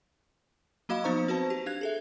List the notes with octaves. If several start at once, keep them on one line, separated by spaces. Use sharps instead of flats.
F#3 A#3 F#4 D#5 F5 B5
F3 B3 D#4 C5 A#5 C#6
C4 F#4 B4 C5 A5
G4
D4 F5 F#6 G#6 F7
G#4 A4 E5